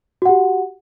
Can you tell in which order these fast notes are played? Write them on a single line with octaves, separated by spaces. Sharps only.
F#4 F#5 G4